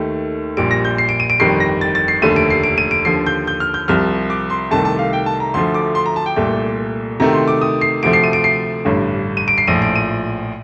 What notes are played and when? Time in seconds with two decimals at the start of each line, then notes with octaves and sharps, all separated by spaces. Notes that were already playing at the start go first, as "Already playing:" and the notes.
Already playing: D#2 D#3 A3
0.57 A#1 A#2 G3 D7
0.71 A#6
0.85 G6
0.98 C7
1.09 D7
1.20 D#7
1.30 D7
1.40 G1 F2 D#3 G3 C7
1.60 A#6
1.81 A6
1.95 A6
2.08 C7
2.22 F1 D#2 D3 A3 D#7
2.36 D7
2.50 C7
2.64 D7
2.78 D#7
2.91 D7
3.05 D#2 D3 F3 C7
3.27 G6
3.47 G6
3.60 F6
3.74 G6
3.88 C2 C3 F3 F6
4.30 D6
4.50 C6
4.71 C2 C3 D#3 A3 A5
4.85 A5
4.99 F5
5.13 G5
5.26 A5
5.40 A#5
5.54 D2 D3 F3 A3 C6
5.74 D6
5.95 C6
6.06 A#5
6.16 A5
6.26 G5
6.36 C2 A#2 A3
7.19 D2 C3 D#3 A3 A#5
7.33 C6
7.48 D6
7.62 D#6
7.81 C7
8.03 D2 C3 F3 A3 D7
8.13 C7
8.24 D#7
8.33 D7
8.44 C7
8.85 A1 G2 D3
9.37 D#7
9.48 D7
9.58 C7
9.67 A#1 A2 F3 D#7
9.82 D7
9.96 D#7